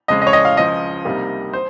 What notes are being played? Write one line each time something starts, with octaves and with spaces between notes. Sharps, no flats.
F2 C#3 G#3 D#5
D#5
C#5
D#5
F5
C#2 C#3 F3 D#5
C2 C3 G3 A#3 D#4
C5